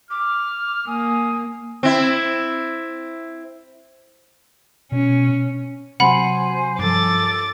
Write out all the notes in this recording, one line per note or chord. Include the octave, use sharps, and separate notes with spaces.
D6 F6
A#3 G#5 D#6
C4 E4
B2 C#4
C3 F#3 C5 F#5 G#5 B5
G2 F3 A4 D6 A6